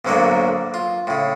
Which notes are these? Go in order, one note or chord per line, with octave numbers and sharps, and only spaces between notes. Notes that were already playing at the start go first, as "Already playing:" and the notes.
B1 G#2 D3 F#3 G#3 A#3
F4
A2 C#3